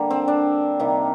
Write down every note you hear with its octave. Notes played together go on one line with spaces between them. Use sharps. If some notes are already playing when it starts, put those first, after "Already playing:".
Already playing: D3 G3 A#3
C4
D4
C3 D#3 G3 A#3